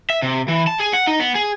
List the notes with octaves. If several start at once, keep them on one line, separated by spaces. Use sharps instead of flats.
E5
C3
E3
A5
G#4
F#5
D#4
B3
G#4